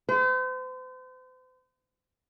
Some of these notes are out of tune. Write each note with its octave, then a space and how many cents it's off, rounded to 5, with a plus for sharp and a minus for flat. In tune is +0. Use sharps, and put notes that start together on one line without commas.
C5 -40